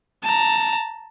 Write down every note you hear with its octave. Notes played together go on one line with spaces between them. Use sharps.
A5 A#5